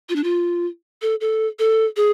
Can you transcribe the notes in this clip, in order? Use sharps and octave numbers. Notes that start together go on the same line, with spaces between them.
F4
D4
F4
A4
A4
A4
G#4